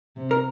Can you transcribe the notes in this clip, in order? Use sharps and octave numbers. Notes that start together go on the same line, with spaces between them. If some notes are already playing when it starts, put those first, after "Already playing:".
C3
A#4